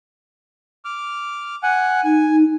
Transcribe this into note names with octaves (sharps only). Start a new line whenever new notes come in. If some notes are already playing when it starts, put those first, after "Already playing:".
D6 F6
F#5 G#5 F#6
D#4 G#5